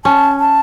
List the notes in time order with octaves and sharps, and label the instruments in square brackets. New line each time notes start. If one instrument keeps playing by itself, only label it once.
[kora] C#4 [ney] A5
[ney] A5